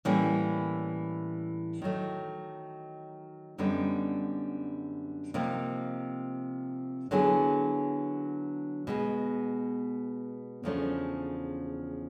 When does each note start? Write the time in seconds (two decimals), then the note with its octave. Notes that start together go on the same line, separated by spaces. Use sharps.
0.05 A2 E3 G3 A#3 C#4
1.82 D#3 F#3 A3
3.58 F#2 D3 G3 B3 D#4
5.34 C3 F3 A#3 D#4
7.11 D3 F#3 B3 E4 G#4
8.87 B2 G#3 B3
10.64 E2 C#3 F3 A3 D4